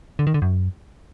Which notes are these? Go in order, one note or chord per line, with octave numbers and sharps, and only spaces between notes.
D3
D#3
D3
F#2